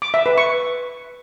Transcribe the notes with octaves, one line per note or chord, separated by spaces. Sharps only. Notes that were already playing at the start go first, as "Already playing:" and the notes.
D6
E5
B4
C#6